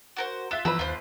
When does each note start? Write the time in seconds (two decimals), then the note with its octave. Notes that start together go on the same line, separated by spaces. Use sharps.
0.17 F#4 A#4 C5
0.51 F4 E5 F#6 E7
0.65 G1 E3 F3 B4 A#5 E6
0.79 D#2 F4 C5